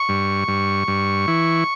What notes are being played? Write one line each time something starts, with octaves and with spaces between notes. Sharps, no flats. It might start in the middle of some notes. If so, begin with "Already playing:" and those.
Already playing: C#6
G2
G2
G2
E3